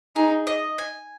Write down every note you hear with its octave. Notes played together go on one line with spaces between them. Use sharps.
D#4 G#4
D#5
G#5